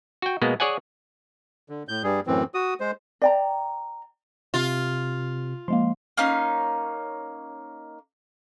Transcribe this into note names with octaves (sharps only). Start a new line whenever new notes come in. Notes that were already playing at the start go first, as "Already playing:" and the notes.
F#4 G5
B2 G#3 A#3 B3
G#4 C#5 D5 F#5 G#5
D3
A2 G6
G2 G3 G#4
F#2 A2 E3 C4
F#4 D#6
G#3 C5
D5 G5 A#5
C3 F4
F3 G#3 A#3 C6
A#3 C#4 D#4 C6